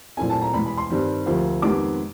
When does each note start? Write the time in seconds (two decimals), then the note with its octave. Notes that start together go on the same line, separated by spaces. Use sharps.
0.17 A#2 F#3 A3 C4 E4 G#5
0.30 A5
0.41 A#5
0.54 E2 B2 G#3 B5
0.66 B5
0.77 C6
0.90 G2 D#3 G3 C4
1.26 D2 C3 F3 A#3
1.62 F2 C3 D#3 G#3 B3 D6